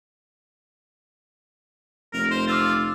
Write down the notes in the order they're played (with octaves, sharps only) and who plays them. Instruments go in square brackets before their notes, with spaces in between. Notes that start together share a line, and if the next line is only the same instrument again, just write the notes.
[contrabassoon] F1 [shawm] A#4
[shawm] C5
[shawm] F4 [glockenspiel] D6 E6 A6